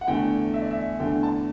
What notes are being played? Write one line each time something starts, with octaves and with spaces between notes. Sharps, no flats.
F#5
E2 D3 A3 G5
E5
D5
E5
E2 D3 A3 G5
A5